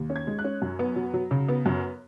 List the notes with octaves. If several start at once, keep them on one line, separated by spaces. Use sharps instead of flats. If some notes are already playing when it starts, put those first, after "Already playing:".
Already playing: D#2
C#4
G#6
G#3
F#6
C#4
F#2
B3
F#3
F#3
C#3
B3
F#2